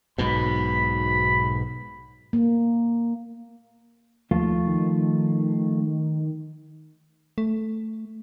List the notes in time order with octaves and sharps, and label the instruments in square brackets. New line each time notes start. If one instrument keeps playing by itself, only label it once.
[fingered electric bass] B1 G#2 B2 [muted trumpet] B5
[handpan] A#3
[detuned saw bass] D#2 [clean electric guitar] F3 A3 F4
[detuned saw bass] D#3
[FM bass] A3